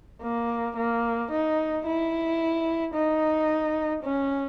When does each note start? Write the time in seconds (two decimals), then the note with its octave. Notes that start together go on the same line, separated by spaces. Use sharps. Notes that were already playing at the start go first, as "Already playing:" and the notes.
0.22 A#3
0.77 A#3
1.31 D#4
1.86 E4
2.94 D#4
4.03 C#4